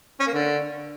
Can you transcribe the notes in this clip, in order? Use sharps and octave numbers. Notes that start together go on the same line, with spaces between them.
C#4
A#3
D3